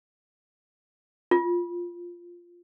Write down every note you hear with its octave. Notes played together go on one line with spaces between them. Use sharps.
F4